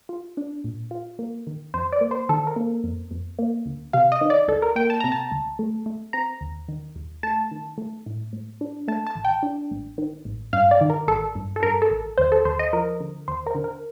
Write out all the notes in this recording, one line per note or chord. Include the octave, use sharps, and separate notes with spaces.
F4
D4
A#2
F4
A#3
D#3
F2 C5
D5
A#3
C5
D#3 A4
A#4
A#3
F2
F2
A#3
D2
C3 F5
D#5
D#3
D5
D2 A4
A#4
A#3 G5
A5
C3 A#5
A5
D2
A3
A3
C4 A#5
D#2
D#3
D#2
A3 A5
D#3
A3
A2
A2
D4
A3 A5
A5
A1
G5
D4
A1
D#3
A1
G2 F5
D5
D#3
A#4
A1 A4
G2
A4
G2 A#4
A4
A1
D#2 C5
A4
D#2 C5
D#5
F3 A#4
D3
D#2 C5
A#4
D3
A#4